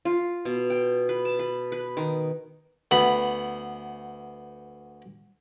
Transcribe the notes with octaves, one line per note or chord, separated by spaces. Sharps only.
F4
B2
G5
B4
A5
B4
B4
D#3
D2 B3 B5